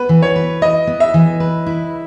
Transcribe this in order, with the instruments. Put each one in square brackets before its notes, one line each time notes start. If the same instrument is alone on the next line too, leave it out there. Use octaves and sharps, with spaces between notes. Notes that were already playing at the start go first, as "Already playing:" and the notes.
Already playing: [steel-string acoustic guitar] B3 [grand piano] B4
[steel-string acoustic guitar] E3
[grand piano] C#5
[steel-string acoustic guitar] B4
[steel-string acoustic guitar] E4 [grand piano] D#5
[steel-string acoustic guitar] B3
[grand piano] E5
[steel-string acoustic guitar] E3
B4
E4